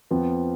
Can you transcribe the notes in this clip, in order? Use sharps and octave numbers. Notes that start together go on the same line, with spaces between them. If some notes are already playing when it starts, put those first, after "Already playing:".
F2 F3 B3